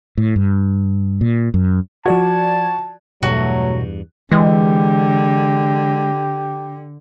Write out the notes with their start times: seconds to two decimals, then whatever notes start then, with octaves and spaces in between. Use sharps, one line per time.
0.18 A2
0.36 G2
1.21 A#2
1.54 F#2
2.06 F3 F#4 D5 A5 G#6
3.23 E2 G2 B2 F#3 A3 F#4
4.32 D3 E3 G#3 G4